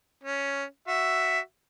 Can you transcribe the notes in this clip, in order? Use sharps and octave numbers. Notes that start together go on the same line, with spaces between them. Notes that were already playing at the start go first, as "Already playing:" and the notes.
C#4
F#4 E5